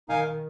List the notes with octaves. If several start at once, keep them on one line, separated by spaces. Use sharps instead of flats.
D#3 D#4 A#4 F5 G#5